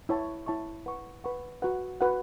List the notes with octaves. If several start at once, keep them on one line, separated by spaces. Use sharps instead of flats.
E4 C#5 E5 A5 C#6
E4 C#5 E5 A5 C#6
B4 F#5 C#6
B4 F#5 C#6
F#4 B4 F#5
F#4 B4 F#5